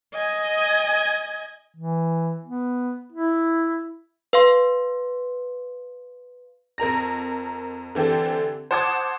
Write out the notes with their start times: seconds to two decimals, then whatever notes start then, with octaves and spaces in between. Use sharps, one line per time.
0.14 D#5 G#5
1.76 E3
2.44 B3
3.12 E4
4.33 B4 F5 C6
6.78 F2 A#4 A#5 A#6
7.95 D3 E3 C4 G4 A4
8.71 C5 F#5 A5 D6 D#6 G#6